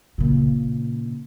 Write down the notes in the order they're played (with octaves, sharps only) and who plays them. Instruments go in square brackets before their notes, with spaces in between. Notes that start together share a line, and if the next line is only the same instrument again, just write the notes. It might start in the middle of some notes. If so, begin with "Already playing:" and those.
[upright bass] A#2 C#3